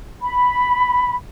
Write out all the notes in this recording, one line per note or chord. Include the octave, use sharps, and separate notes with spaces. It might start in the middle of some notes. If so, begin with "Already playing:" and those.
B5